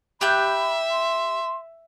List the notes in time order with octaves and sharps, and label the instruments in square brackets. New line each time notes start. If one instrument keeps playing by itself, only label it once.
[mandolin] G4 F#6 G6 [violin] E5 [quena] B5
[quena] C6